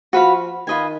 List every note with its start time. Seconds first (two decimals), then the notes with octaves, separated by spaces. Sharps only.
0.13 F3 F#4 B4 F5 B5
0.67 D#3 F4 B4 D#5 G#5